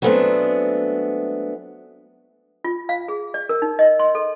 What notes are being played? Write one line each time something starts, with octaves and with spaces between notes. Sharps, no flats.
F#3 G#3 A3 B3 C4 D4
F4
F5
G#4
D5
A#4
D#4
D#5
C6
A4